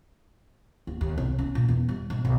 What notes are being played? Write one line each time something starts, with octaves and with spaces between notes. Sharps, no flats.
D#2
D#2
C2
C#4
A#2
E2
G3
A#1
B1